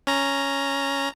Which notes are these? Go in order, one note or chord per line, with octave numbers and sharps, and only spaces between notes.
C#4 A#5